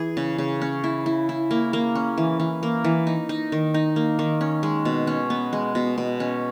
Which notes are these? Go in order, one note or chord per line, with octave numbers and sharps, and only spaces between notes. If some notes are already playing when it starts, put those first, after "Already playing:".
Already playing: E3 E4 G#4
C#3
C#3
C#4
E4
E4
E4
A#3
A#3
C#4
E3
E3
A#3
E3
D#4
D#4
D#3
D#4
A#3
D#3
C#4
G#3
B2
C#4
B3
G#3
B2
B2
C#4